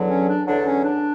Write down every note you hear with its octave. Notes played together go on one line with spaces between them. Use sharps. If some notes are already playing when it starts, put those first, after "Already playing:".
Already playing: E2 D3 F#3
C#4
D4
E2 D3 F#3 D4
C#4
D4